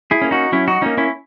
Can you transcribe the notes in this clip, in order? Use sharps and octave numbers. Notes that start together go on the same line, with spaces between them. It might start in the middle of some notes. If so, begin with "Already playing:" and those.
E4 G#4
A#3 C#4
D#4 F#4
F#3 C#4 E4
D#4 F#4
A#3 C#4 D#4
C#4 E4